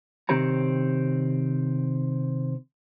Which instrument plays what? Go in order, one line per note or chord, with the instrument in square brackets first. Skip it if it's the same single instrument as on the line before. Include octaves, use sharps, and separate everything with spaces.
[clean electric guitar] C3 D#3 C4 G4 C#5 A#5